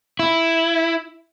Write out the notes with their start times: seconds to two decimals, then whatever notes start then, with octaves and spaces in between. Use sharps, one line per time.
0.19 E4